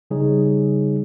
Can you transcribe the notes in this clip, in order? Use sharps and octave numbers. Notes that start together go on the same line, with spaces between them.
C#3 G3 D#4 G#4 C#5